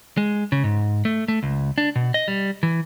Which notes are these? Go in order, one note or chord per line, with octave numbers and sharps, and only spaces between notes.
G#3
C#3
G#2
A3
A3
C#2
D4
B2
D#5
G3
E3